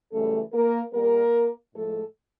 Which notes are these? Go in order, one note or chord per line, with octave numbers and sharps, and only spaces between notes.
F#2 C#3 E3 G3 A3 A4
A#3 A#4
A#2 G3 A#3 A#4
A2 F3 G#3 A3 A4